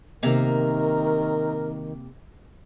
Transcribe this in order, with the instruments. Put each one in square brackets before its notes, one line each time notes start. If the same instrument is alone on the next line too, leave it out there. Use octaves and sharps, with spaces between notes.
[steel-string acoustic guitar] C3 A#3 [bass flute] D#3 [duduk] A#4